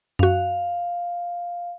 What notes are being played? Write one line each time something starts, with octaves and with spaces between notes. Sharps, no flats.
F#2 F#4 F5